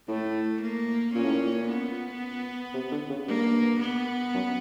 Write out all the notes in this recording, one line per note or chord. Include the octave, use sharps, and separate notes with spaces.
A2 A3
A#3
A#2 C#4
A2
A#2
B3
C3
D3
C#3
G2 A#3
B3
F#2